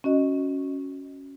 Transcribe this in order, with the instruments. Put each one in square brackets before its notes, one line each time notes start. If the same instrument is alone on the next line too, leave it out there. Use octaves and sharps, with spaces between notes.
[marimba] C#4 F#4 D#5